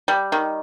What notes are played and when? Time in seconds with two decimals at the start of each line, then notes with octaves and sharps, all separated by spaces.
0.08 G3
0.32 D#3